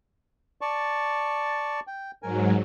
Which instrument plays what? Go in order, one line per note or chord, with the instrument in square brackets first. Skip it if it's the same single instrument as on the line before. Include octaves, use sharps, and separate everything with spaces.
[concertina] D5 A5 C#6
G5
[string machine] G#2 F#3 [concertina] A#4 G#5